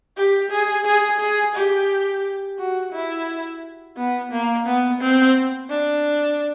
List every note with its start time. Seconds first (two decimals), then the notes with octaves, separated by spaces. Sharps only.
0.17 G4
0.51 G#4
0.85 G#4
1.20 G#4
1.55 G4
2.58 F#4
2.92 E4
3.97 B3
4.31 A#3
4.66 B3
5.01 C4
5.70 D4